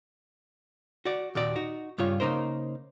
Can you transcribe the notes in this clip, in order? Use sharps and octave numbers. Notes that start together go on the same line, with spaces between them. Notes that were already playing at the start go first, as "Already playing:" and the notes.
F#4 D5
D#2 A#2 F#4 D5
D#4 F#4
G2 C#3 F4 C#5
C#3 A#3 D#4 A#4 C5